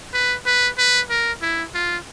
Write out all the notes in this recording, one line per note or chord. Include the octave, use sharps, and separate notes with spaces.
B4
B4
B4
A#4
E4
F4